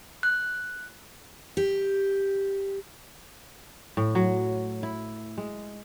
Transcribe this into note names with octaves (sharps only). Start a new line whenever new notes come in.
F#6
G4
A2
F#3
E4
G#3